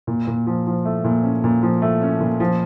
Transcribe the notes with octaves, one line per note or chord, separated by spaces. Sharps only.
A#2
A#2
F3
F3
A3
A#2
C#4
A#2
F3
A3
C#4
A#2
F3